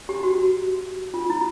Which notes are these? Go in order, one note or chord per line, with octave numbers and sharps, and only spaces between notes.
G4
F#4
F4
E4